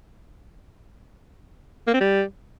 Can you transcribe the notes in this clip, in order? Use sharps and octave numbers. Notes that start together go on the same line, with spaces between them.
A#3
C4
G3